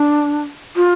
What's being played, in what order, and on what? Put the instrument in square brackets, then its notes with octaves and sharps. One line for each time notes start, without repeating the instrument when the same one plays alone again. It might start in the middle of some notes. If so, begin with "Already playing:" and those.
Already playing: [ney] D4
F4